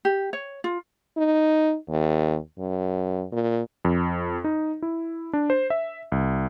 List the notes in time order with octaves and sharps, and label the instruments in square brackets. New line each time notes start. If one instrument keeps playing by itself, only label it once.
[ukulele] G4
C#5
F4
[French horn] D#4
D#2
F#2
A#2
[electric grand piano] F2
D#4
E4
D4
C5
E5
C2